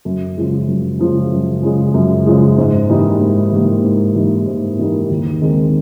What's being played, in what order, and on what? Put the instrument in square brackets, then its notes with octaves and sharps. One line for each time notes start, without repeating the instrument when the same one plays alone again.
[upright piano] F#2
C#3 F3 G#3
F#2
C#3 F3 G#3
F#2
C#3 F3 G#3
F#2
C#3 F3 G#3
G#2
E3 G3 A#3 D#4
G#2
E3 G3 A#3 D#4
G#2
E3 G3 A#3 D#4
G#2
E3 G3 A#3 D#4
D#2
D#3 G#3 C4